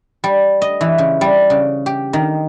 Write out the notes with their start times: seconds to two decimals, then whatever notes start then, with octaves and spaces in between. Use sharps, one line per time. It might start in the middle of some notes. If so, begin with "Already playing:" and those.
0.24 G3
0.62 D#5
0.81 E3
0.98 C#3
1.21 G3
1.50 C#3
1.86 G4
2.13 D#3